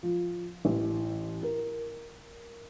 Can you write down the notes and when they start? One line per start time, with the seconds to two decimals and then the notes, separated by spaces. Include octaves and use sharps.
0.03 F3
0.65 A1
1.43 A#4